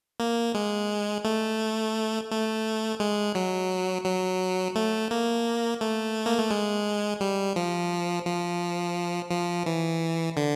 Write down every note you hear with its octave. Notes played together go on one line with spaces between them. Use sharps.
A#3
G#3
A3
A3
G#3
F#3
F#3
A3
A#3
A3
A#3
A3
G#3
G3
F3
F3
F3
E3
D3